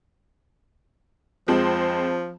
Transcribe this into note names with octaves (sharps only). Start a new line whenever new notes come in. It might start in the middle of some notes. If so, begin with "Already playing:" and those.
F2 F3 G#3 C4